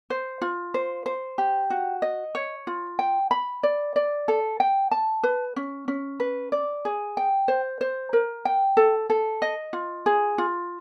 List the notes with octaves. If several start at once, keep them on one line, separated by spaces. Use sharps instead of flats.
C5
F4
C5
C5
G4
F#4
D#5
C#5
F4
G5
B5
D5
D5
A4
G5
A5
B4
C#4
C#4
B4
D5
G#4
G5
C5
C5
A#4
G5
A4
A4
D#5
F4
G#4
F4